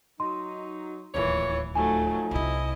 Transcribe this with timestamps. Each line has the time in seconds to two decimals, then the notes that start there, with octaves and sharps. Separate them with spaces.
0.20 F#3 D#4 C6
1.15 D1 D#2 A#2 E3 C#5
1.75 F3 F#3 A3 D#4 G#5
2.31 C2 C3 E4 D#5